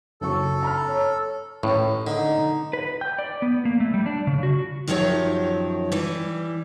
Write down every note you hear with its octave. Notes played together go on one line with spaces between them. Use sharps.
F#1 F#3 A4 C#6
A#5 B5 F6
C#5
A1 A2
D3 D#4
B4
G5
D5
B3
A#3
A3
G3
D4
C#3
F#4
F#2 D#3 F3 F#3 G4 C#5
E3 G3